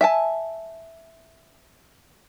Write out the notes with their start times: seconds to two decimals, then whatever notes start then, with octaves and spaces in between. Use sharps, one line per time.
0.01 E5 G#5 A5